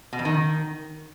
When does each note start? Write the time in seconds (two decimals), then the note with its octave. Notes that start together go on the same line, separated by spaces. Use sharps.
0.13 B2
0.19 F2
0.25 D#3